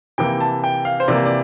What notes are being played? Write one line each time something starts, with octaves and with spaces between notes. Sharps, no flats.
C3 E3 A#3 G5
A5
G5
F5
C5
C3 E3 A#3 D5
D5